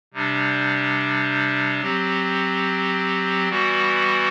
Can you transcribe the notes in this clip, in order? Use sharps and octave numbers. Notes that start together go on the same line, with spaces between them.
C3 G3 D4
F#3 C4 G4
E3 G3 B3 F#4